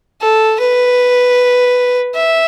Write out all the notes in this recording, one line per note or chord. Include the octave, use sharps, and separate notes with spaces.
A4
B4
E5